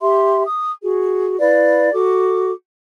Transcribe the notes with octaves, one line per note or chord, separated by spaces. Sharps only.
G4 E5 C6
D#6
F#4 G#4
E4 B4 D5 F5
F#4 A4 D6